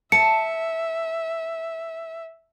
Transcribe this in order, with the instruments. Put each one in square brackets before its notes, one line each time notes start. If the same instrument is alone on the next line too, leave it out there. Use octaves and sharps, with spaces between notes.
[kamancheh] E5 [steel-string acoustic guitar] A5 [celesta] C#7